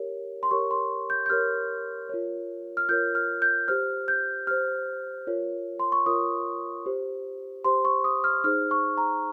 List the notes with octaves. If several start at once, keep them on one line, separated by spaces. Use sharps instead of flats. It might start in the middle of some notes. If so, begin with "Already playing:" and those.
Already playing: G4 A#4 C#5
C6
G4 A#4 C#5 C#6
C6
G6
G6
G4 A#4 C#5 F6
F4 A#4 C#5
F6
F4 A#4 C#5 G6
F6
G6
G4 C5 F6
G6
G4 C5 F6
F4 A#4 C#5
C6
C#6
F4 A#4 C#5 D#6
G4 C5
G4 C5 C6
C#6
D#6
F6
D#4 G#4 C5 F6
C#6
A#5